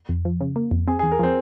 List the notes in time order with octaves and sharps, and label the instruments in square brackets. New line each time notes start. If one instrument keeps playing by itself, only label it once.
[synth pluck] F2
F3
C#3
A#3
F2
[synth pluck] C4 [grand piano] G#4
[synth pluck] E2 [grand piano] G#4
[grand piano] A#4
[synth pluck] F3 [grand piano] C4